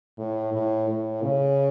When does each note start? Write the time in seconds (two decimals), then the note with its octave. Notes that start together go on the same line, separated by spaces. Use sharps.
0.18 A2
0.54 A2
0.89 A2
1.23 C#3